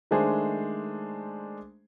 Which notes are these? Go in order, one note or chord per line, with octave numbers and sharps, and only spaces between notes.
D#3 G#3 A3 D4 G#4 C5